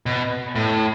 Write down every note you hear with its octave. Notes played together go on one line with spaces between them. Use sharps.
B2
A2